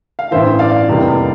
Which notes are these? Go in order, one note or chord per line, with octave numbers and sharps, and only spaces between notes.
F5
A1 G2 E3 C5 E5
D5 F5
F1 E2 C3 G3 A#3